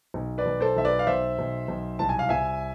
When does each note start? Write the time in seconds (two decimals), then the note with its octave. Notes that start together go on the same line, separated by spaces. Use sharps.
0.14 B1
0.38 B4 D5
0.46 B1
0.60 A4 C5
0.77 B1 E5
0.85 B4 D5
0.99 F5
1.07 B1 C5 E5
1.39 B1
1.68 B1
1.99 C2 A5
2.09 G#5
2.19 F5
2.29 C2 E5 G#5